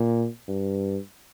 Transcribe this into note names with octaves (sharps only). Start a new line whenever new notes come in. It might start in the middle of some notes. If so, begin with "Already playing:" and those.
Already playing: A#2
G2